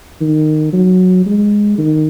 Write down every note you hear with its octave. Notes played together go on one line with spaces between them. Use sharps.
D#3
F#3
G#3
D#3